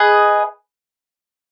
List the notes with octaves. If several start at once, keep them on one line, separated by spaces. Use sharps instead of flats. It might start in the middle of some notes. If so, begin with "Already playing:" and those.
Already playing: G#4 B4 D#5